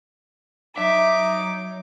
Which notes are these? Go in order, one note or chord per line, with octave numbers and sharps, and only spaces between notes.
F#3 D#4 E5 D6